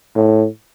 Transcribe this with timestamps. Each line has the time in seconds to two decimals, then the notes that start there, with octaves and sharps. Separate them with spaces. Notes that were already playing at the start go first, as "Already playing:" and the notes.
0.16 A2